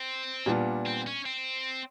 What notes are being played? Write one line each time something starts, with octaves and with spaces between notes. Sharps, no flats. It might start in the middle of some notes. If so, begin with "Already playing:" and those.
Already playing: C4
A#2 G3 B3 D4 F4
C4
C#4
C4